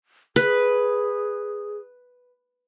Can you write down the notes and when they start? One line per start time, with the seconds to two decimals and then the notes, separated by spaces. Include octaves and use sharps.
0.36 G#4 B4